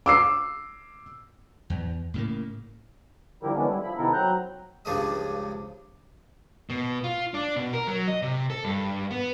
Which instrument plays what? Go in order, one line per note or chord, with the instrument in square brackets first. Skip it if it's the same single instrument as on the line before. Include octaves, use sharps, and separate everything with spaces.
[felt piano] D6 E6 C7
[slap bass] E2
A2 C#3 A#3
[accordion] D3 F3 G3 E4 G4 A#4
D3 E3 G#3 B3 C#4 D4
G3 E4
F3 E4 B5
C3 D#3 B3 E4 A4 A#4
F#3 C4 A#5 F#6 G6
[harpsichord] C#2 G2 F3 D4 D#5 D#6
[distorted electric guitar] B2
F4
D4
B2
A#4
F#3
D#5
C3
A4
G2
B3